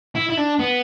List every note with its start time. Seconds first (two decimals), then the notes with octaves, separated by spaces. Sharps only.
0.15 E4
0.29 E4
0.37 D4
0.59 B3